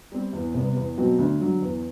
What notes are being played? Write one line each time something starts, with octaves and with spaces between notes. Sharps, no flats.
G3 C4
E2
C3 G3 B3
E2
B2 F#3 C4 F#4
D2
D3 F#3
E2